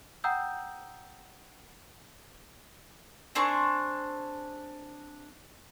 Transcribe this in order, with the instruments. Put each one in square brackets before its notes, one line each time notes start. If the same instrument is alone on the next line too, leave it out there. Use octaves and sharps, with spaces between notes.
[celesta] F#5 G5 A#5 D#6 E6 G6
[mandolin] C4 D4 G#4 C#6